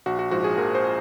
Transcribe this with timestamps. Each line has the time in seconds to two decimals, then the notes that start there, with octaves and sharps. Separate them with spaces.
0.06 A#1 F#4
0.19 F#4
0.31 G#2 F3 F#4
0.44 G#4
0.57 A#1 A#4
0.75 C5